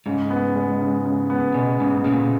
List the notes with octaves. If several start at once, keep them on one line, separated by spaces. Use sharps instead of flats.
G#2 C#3
B3
G#3
C#3
C#3
B3
B2 G#3
G#2 C#3
A#2 C#3